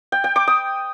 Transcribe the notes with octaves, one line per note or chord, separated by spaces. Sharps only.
G5
G5
D6
D#6